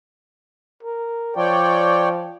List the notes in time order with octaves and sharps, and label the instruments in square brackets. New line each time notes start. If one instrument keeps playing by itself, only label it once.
[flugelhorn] A#4
[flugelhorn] F3 [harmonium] C#5 D5 G5